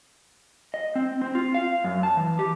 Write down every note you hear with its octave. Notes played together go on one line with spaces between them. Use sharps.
D#5
C4
C4
F4
F5
F#2
A5
E3
G4